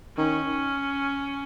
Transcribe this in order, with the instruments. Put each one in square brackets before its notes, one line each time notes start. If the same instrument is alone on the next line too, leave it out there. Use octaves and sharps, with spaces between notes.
[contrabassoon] D#3 [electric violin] C#4